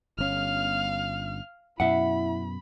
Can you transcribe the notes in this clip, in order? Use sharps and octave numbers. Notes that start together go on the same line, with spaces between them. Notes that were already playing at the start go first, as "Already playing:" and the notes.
G1 C#4 F5 F6
F#2 B2 E4 E5 F#5 B5